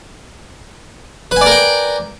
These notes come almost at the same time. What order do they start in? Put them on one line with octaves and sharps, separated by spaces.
B4 G#5 D5 A#4 G5